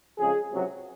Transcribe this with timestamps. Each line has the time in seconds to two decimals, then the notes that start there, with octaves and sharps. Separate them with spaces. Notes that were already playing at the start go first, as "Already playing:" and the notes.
0.17 F2 C#3 G#3 G#4
0.50 C#2 C3 F#3